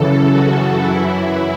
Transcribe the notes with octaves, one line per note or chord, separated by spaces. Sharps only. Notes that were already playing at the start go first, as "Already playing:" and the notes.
Already playing: F#2 C#3 E3 A4
F#4
F#2 E3 E4